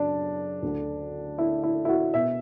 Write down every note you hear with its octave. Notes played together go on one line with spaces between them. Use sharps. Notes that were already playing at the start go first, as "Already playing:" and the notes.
Already playing: F#2 C#3 D4
D2 D3
E4
E4
E4
F#4
B2 E5